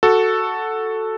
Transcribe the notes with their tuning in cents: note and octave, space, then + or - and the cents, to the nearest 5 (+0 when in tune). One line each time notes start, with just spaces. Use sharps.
F#4 +0 A4 +0